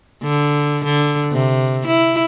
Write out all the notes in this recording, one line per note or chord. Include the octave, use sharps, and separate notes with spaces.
D3
D3
C3
E4